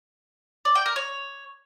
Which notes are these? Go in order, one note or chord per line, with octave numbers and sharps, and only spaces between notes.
D5
G5
A#4
C#5